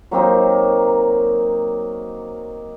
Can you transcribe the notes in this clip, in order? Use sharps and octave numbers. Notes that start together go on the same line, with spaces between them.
F#3 A#3 C4 D#4